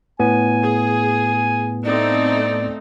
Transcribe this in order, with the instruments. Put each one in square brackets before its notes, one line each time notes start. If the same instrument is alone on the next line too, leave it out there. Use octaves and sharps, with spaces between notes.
[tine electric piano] A2 B3 [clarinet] G#5
[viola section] G#4
[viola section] A3 C4 D#4 [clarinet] D5